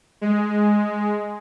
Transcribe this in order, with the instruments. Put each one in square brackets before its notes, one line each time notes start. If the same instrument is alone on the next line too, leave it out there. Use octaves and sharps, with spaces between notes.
[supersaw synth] G#3